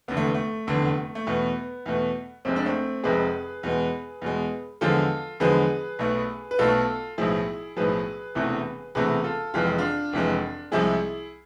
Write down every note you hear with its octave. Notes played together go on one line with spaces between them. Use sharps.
F1 E2 D3 B3
A3
A3
F1 E2 D3
A3
E2 B2 A3 B3
E2 B2 A3
F1 F2 C3 G#3 C4
D4
A3 C4
F1 F2 C3 G#3 G#4 B4
E2 B2 G#3
E2 B2 G#3
E2 D3 F3 G#3 F4 A4
E2 D3 F3 G#3 G#4 B4
B1 B2 A3
B4
B1 B2 A3 F4 A4
B1 A2 F3 E4 G#4
B1 A2 F3 G#4 B4
E1 E2 C3 E3 A3
E1 E2 C3 E3 A3 G#4 B4
F4 A4
F1 F2 E3 G#3 F4
G#4
D4 F4
F1 F2 E3 G#3
C2 C3 F3 G#3 E4 G#4